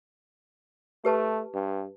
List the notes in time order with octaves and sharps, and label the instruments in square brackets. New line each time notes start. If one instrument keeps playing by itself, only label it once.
[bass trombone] A3 [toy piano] G4 B4 A5
[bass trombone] G2